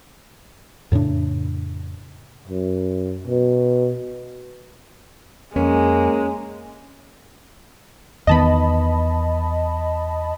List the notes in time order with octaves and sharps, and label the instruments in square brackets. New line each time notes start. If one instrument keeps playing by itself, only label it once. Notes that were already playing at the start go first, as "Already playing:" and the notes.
[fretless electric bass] F2 A2 C#3 D4
[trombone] F#2
B2
[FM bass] F2 [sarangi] G#3 [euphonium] A#3 [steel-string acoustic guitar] C#4
[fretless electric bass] E2 D#3 B3 [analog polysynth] D#5 A5 B5